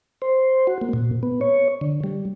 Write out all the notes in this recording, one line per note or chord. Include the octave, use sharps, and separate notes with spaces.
C5
F#4
A#3
A#2
B3
C#5
D3
G3